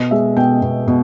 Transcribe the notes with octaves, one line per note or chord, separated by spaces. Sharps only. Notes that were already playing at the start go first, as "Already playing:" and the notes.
Already playing: B2 D#5
G#3 E5
B2 G5
B2
B2